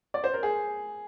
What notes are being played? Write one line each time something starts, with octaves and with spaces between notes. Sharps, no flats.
D5
C5
A#4
G#4